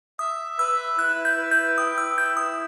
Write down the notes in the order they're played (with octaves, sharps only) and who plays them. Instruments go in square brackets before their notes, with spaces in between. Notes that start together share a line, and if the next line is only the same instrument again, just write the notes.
[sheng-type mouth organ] E5 [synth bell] D#6
[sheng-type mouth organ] B4 [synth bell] E6
[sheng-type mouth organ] E4 [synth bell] F#6
[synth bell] G6
[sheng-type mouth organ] B4
[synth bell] G6
[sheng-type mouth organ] G5 [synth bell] D#6
[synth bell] E6
[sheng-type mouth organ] E4 [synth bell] G6
[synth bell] D#6